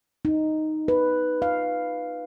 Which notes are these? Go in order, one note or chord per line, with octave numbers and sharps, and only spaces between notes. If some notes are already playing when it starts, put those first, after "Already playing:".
D#4
B4
F5